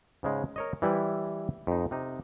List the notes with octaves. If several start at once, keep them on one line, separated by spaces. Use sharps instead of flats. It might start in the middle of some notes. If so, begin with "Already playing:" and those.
G#2 C#3 G#3
A#4 C#5 D#5
E3 G3 E4 B4 C5
F2 D#4
C3 D#4